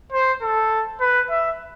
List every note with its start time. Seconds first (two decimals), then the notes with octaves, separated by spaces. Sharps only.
0.12 C5
0.42 A4
1.00 B4
1.30 E5